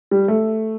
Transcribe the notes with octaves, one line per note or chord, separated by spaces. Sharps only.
G3
A3